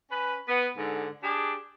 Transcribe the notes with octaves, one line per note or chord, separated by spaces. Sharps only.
C#4 B4
B3
G#2 D3
D4 G4 G#4